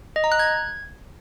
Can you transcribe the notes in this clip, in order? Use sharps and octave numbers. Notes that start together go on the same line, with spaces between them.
D#5
A#5
F#6
G#6